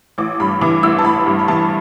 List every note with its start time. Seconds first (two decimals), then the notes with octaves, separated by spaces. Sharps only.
0.18 A1 D6
0.40 G2 B5
0.61 E3 D6
0.83 A1 E6
0.98 A5
1.04 A1 B5
1.26 G2
1.39 B5
1.48 E3 A5